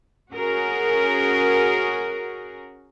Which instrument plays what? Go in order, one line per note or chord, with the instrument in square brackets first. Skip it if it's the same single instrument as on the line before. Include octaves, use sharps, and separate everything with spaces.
[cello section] C#4 F#4 G#4 A#4